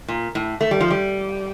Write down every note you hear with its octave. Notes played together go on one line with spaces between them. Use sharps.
A#2
A2
A3
G3
F3
G3